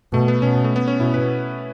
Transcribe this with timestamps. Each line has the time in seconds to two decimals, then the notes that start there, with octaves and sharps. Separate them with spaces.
0.13 B2 A3
0.28 B3
0.41 B2 C#4
0.64 A3
0.76 B3
0.88 C#4
1.00 B2 E4
1.14 B4